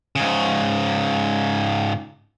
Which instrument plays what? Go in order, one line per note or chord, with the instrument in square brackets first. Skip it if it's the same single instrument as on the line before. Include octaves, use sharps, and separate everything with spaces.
[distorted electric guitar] G#2 C#3